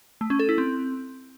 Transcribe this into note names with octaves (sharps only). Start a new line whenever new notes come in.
A3
C#4
A4
E4
C4